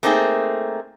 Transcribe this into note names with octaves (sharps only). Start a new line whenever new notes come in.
A3 A#3 C4 D#4 G#4